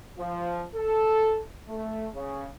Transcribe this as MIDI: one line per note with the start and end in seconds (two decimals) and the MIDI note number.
0.18 0.65 53
0.75 1.39 69
1.68 2.08 57
2.14 2.45 49